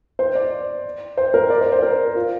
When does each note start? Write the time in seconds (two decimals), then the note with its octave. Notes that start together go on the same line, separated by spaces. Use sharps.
0.19 C5
0.35 D5
1.17 C5
1.34 A#4
1.50 D5
1.61 C5
1.72 C5
1.82 A#4
2.15 F4